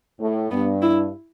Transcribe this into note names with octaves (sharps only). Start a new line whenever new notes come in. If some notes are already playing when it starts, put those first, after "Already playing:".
A2
G2 B3
E4